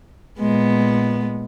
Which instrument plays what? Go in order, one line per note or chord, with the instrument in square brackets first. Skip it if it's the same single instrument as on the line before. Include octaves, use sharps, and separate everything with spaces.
[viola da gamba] A#2 G#3 B3